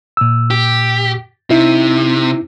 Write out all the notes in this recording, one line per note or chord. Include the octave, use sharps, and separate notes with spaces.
A#2 E6
G4
C3 D#4 E4